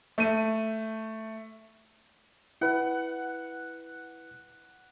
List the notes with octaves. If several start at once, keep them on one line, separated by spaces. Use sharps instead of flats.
A3 D#7
E4 B4 F#5